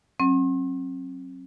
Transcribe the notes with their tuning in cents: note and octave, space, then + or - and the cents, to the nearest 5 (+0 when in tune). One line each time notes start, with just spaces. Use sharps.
F#3 +10 C4 +45